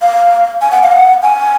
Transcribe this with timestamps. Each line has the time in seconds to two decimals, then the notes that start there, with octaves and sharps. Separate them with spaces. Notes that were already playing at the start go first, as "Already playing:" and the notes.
0.02 F5
0.62 G#5
0.72 F#5
0.83 F5
0.92 F#5
1.23 G#5